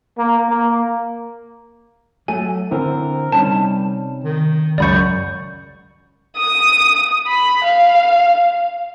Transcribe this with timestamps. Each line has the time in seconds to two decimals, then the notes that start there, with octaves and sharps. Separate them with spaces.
0.18 A#3
0.49 A#3
2.28 F#3 A3 G#5
2.71 D3 C4 E4 A#4
3.32 C3 G3 C#4 D#4 A5
4.24 D#3
4.78 C#2 F#2 D5 B5 C#6 G6
6.36 D#6
7.27 B5
7.64 F5